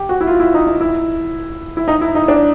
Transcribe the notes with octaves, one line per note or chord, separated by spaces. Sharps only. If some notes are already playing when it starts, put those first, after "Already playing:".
Already playing: G4
F#4
E4
F4
E4
D#4
D#4
E4
E4
D#4
E4
D#4
D4